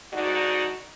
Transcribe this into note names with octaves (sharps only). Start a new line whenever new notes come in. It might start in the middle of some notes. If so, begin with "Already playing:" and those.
G#2 D3 D#4 F#4 D5